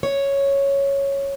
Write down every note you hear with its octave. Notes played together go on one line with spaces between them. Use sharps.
C#5